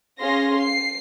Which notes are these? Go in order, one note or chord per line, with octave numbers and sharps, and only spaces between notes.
C#4 G#4 F5 C6 A#6
C7